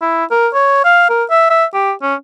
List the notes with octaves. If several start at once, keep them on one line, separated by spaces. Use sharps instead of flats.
E4
A#4
C#5
F5
A#4
E5
E5
G4
C#4